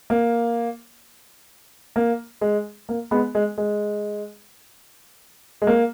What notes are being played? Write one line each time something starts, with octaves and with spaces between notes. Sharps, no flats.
A#3
A#3
G#3
A#3
G#3 B3
G#3
G#3
G#3
A#3